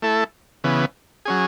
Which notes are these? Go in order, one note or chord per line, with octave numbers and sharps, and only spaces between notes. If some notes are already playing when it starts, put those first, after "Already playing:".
A3 E4 A4
C#3 E3 B3
F#3 C#4 G#4